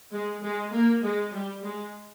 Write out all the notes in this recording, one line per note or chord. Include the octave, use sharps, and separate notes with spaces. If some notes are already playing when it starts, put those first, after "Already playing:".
G#3
G#3
A#3
G#3
G3
G#3